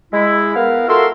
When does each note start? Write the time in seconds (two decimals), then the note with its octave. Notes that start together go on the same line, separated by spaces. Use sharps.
0.13 G#3 E4
0.56 B3 A#4 F5
0.89 F4 F#4 A4 A#4 E5 C6